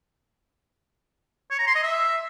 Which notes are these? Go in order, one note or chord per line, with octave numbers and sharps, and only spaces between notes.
C#5
A#5
C6
D#5
E5